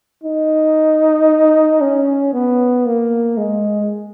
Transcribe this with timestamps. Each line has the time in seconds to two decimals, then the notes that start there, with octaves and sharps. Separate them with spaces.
0.23 D#4
1.81 C#4
2.33 B3
2.86 A#3
3.37 G#3